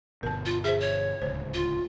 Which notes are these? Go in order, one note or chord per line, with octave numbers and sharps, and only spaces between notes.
G1 B2 A#4 A5
F4
G#4 C5 E5
C#5
D1 C#2 C5
F4